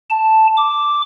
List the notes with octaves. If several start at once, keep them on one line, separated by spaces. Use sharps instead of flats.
A5
D6